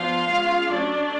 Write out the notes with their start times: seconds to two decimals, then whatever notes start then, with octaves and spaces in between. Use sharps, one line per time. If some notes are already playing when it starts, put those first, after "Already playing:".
Already playing: F3 B3 D4 F4 F5
0.29 G#3 C#4
0.69 F#3 A3 C#4 D4 D5